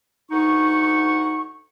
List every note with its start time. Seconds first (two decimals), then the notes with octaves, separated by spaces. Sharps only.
0.31 D2 D#4 F#5 C#6